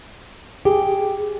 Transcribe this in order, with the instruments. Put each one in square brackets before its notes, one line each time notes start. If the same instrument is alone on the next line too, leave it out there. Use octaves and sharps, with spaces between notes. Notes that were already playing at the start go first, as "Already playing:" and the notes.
[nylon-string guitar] G4 [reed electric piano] G#4